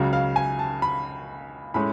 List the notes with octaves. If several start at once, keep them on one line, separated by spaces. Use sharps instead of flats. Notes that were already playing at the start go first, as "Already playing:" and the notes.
Already playing: C#2 C#3 F#3
F5
G#5
A5
B5
A2 G#3 C#4 B5